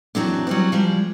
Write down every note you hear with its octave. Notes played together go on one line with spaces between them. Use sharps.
F#2 E3 F#3 C4 D4
F#3 G3 C4
F3 G3 G#3